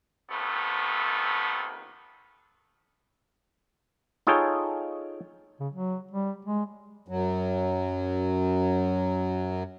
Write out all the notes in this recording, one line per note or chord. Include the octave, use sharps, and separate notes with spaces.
A#1 C3 D#3 A3 B3
D#4 F4 G#4 A4 C#5 G5
C#3
F#3
G3
G#3
F#2 F#3